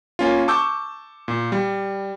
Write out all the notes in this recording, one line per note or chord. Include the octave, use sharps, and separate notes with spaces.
A#3 C#4 F4
A5 C#6 D6 E6 G6
A#2
G3